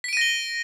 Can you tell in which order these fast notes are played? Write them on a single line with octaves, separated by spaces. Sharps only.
B6 D7 D#7 A#6 G7